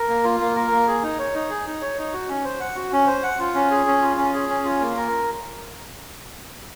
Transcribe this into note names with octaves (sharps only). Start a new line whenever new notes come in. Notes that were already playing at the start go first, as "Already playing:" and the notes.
Already playing: A#4
A#3
F4
A#3
A#4
A#3
G#4
D#4
C#5
D#4
G#4
D#4
C#5
D#4
F#4
C#4
C5
F#5
F#4
C#4
C5
F#5
F4
C#4
G#4
C#4
F4
C#4
G#4
C#4
F4
A#3
A#4